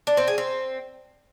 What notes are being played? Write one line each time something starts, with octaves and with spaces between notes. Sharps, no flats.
D4
C4
G#4
C4